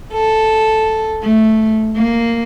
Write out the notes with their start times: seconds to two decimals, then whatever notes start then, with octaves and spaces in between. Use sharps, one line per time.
0.12 A4
1.24 A3
1.96 A#3